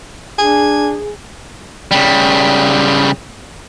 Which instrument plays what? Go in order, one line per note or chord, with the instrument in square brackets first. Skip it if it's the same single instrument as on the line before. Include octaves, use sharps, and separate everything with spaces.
[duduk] D4 [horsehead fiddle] G#4 [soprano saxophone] G#5
[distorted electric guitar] C#3 G3